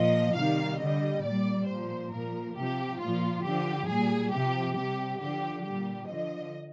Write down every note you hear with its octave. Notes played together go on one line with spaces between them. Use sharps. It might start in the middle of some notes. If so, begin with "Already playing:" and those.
Already playing: A#2 F3 D#5
C3 D#3 G3 F5
D3 G3 D#5
A#2 G3 D5
A#2 F3 C5
A#2 F3 A#4
C3 F3 G4
A#2 F3 F4
D3 F3 G4
A#2 G3 G#4
C3 F3 G4
C3 G3 G4
D3 F3 G4
A#2 G3 G4
D3 F3 D#5